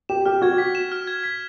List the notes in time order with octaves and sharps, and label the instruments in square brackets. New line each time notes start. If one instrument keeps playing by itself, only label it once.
[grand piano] G4 [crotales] E7
[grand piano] G4 [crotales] F6
[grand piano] F#4 [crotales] G#6
[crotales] B6
E7
F6
G#6
B6